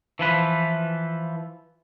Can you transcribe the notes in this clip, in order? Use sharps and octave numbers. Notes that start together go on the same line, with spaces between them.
E3 F3 B4